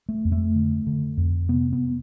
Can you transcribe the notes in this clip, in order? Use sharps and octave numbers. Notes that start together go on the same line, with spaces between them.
A3
F2
A3
D3
D3
F2
C3 B3
B3